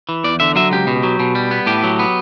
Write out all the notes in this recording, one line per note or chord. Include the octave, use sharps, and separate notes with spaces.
E3
E2 D5
D3 E5
F#3 E5
C#2 G4
B2
F#3
B2
G3
B3
A2 G4
F#3
B3